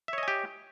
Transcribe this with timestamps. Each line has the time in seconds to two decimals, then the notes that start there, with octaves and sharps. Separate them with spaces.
0.08 E5
0.13 C#5
0.18 D#5
0.23 G#5
0.28 G4